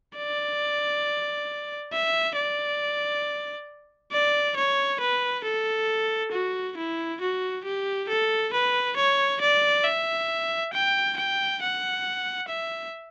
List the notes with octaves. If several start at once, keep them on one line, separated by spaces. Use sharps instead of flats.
D5
E5
D5
D5
C#5
B4
A4
F#4
E4
F#4
G4
A4
B4
C#5
D5
E5
G5
G5
F#5
E5